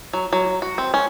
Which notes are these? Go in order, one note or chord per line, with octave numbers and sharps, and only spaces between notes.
F#3
F#3
F#4
C4
C#4